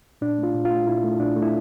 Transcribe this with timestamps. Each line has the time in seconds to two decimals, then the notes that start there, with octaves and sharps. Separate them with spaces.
0.21 A#2 D4
0.38 A3 F4
0.54 A#2
0.65 F4
0.70 A3
0.87 A#2 E4
1.04 A3
1.19 A#2 D4
1.36 A3
1.42 E4